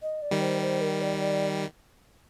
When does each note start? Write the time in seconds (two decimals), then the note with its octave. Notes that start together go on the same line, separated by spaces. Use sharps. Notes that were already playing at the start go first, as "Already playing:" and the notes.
0.02 D#5
0.22 D5
0.31 D#3 G3
0.41 C5
0.62 C5
0.81 A#4
1.02 D5
1.21 D5